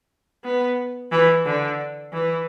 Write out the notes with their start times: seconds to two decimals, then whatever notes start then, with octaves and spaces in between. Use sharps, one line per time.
0.44 B3
1.11 E3
1.45 D3
2.13 E3